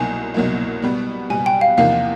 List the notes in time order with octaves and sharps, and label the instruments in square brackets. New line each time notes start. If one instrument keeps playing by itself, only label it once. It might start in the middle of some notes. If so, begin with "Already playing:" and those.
Already playing: [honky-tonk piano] C2 B2 F#3 A#3 D#4 [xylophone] G#5
[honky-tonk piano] C2 B2 F#3 A#3 D#4
B2 G3 B3
[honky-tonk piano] B2 G3 B3 [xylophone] G#5
[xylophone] G5
F5
[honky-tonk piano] E2 C3 F3 A#3 D#4 [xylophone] F5